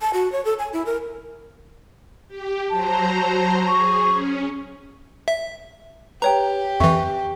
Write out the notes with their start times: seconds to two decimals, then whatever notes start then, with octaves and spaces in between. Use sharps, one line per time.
0.01 A5
0.14 F#4
0.32 C#5
0.45 A4
0.59 G#5
0.73 E4
0.86 A#4
2.28 G4
2.70 F#3 C5 A5 A#5
3.68 G#4 C#6
4.05 C#4
5.28 E5
6.22 G4 B4 C#5 G5 A#5
6.80 F2 E3 E5 C#6